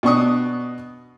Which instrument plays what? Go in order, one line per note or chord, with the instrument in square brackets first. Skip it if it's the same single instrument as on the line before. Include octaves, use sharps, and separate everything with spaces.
[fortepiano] B2 D4 C#6 D#6